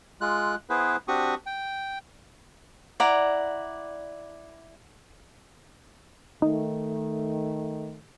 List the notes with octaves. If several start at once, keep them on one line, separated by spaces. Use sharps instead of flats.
G#3 F4 F#6
B3 E4 G#4 B4 C5
C4 D4 F#4 G4 C#6 D#6
G5
E4 D5 F#5 A#5
D#3 A3 D#4